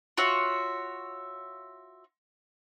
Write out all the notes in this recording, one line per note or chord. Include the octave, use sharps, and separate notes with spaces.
F4 F#4 C#5 E5